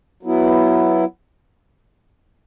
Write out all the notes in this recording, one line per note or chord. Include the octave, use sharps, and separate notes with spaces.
F#3 B3 E4